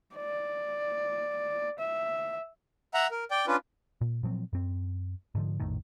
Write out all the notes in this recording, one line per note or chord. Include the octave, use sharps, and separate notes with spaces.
D5
E5
E5 F#5 A#5
A#4
D5 G5
C#4 D4 F4 B4
A#2
A#2 F3 F#3 C4
F#2 C4
G#2 D3 F3
A#1 F2 A2 D#3